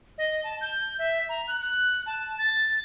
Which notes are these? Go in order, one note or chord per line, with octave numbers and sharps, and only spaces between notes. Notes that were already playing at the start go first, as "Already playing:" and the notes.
D#5
A5
G6
E5
A#5
F#6
F#6
A5
A6